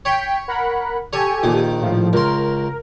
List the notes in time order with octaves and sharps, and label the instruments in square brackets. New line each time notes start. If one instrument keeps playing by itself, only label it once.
[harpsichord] C#5 [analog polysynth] G5 B6
[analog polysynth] A#4 F#5 B5
[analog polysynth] G4 A4 G#5 [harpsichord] C#5
[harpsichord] A#1 D#3
[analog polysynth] A2 F3
[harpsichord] C#2 C6 [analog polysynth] A#4